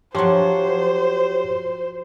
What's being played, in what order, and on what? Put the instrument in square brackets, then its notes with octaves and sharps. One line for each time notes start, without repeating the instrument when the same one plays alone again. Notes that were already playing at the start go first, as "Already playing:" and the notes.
[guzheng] F3 F#3 [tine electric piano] G4 C#5 C6 [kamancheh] C5